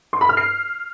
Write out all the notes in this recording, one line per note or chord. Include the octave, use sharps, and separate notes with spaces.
C6
B5
F6
C7